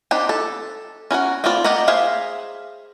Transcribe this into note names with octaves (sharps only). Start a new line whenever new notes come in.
C4 D4 D#4 G4 F#5
A4
C#4 F#4 A#4 F#5
A3 B3 C4 F4 D5
A3 G4 D#5 F#5 A#5
G#4 C5 E5 F5